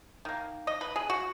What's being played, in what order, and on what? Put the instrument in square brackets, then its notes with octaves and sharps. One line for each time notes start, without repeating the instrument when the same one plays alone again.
[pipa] D#3 A#3
D#5
B4
G#4
F#4